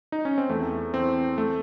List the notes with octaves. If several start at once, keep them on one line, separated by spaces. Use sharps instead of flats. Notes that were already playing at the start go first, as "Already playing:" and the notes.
D#4
C#4
C4
E2 A3
E3 C4
A3